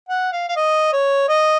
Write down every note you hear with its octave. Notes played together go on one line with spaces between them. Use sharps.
F#5
F5
F5
D#5
C#5
D#5